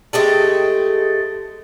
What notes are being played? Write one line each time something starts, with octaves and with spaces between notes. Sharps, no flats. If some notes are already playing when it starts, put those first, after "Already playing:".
G#3 A3 G4 A4